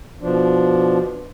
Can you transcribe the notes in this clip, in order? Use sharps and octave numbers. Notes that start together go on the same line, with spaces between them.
B2 F3 D4